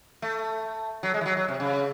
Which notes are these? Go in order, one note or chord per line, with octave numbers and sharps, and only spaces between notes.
A3
F#3
G#3
E3
F#3
F#3
C3
C#3